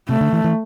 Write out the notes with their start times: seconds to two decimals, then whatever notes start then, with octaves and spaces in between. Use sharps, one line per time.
0.09 C3 A3
0.20 D3
0.32 E3
0.44 E3